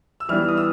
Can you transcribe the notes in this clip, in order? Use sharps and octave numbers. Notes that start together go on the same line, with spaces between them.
E6
E3 G3 B3 D4 F6
D#6
E6